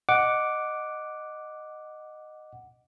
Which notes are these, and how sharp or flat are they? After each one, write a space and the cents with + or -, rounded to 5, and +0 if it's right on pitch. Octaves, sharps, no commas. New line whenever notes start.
D#5 -10 F#5 +0 D6 +0